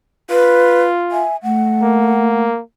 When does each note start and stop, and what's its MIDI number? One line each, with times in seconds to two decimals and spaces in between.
0.30 1.25 65
0.30 0.83 71
1.12 1.33 76
1.12 1.36 80
1.43 2.44 57
1.43 2.41 78
1.82 2.60 58